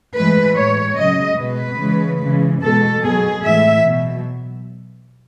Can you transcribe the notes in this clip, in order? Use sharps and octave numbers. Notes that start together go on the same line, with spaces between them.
A2 E3 G#3 B4
A2 G#3 C#5
C#3 F#3 D#5
B2 G#3 B4
C#3 E3 G#3
C#3 E3 G#3
B2 G#3 A4
B2 F#3 G#4
A2 E3 G#3 E5
B2 F#3